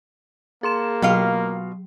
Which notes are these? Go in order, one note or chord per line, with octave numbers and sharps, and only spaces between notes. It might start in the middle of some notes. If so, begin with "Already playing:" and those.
A#3 G#4 C6 E7
B2 F#3 F4 F5